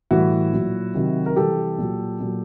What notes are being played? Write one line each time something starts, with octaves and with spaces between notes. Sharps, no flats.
A2 E3 G3 E4 F#4
A#2 F#3
C3 D#3 F#3
A#4
C3 E3 G3 G4 A4
A#2 F#3
A#2 F#3